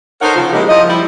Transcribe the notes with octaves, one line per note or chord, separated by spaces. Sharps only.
D#4 A4 A#4 C5 C#5 F#5
C#3 F3
G#3 A#3 D#4 E4 F#4 G4
F3 D#5
G3 E4